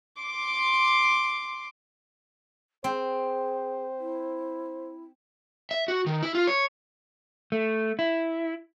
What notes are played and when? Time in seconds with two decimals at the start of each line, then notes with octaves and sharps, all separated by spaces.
0.22 C6 D6
2.84 C4 G#4 C5
4.00 E4
5.71 E5
5.88 F#4
6.06 D#3
6.23 E4
6.35 F4
6.47 C#5
7.52 A3
7.99 E4